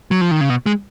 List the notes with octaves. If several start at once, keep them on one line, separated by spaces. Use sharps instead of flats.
F#3
F3
D#3
C#3
B2
G#3